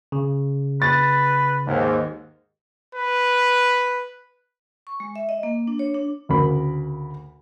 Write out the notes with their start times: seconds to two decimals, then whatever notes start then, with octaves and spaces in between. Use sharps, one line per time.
0.12 C#3
0.82 B4 A6
1.66 D#2 G#2
2.95 B4
4.87 C#6
5.00 G#3
5.16 E5
5.29 D#5
5.43 A#3
5.67 D4
5.79 C#5
5.94 D4
6.29 D2 C#3 A#4 B5